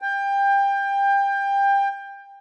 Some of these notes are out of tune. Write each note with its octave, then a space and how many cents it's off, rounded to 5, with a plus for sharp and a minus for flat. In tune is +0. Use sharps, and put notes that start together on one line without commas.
G5 +25